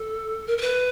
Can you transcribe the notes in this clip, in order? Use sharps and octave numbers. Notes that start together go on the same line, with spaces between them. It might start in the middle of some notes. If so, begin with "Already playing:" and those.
Already playing: A4
A#4
A#4
B4